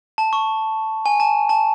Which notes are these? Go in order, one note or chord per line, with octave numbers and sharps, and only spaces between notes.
A5
C#6
G#5
A5
A5